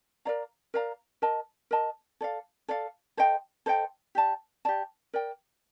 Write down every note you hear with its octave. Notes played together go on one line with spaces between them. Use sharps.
A#4 D5 F5 A#5
A#4 D5 F5 A#5
A#4 D#5 A5
A#4 D#5 A5
A4 D5 F5
A4 D5 F5
A4 C5 D#5 G5
A4 C5 D#5 G5
G4 D5 A5
G4 D5 A5
A#4 D5 G5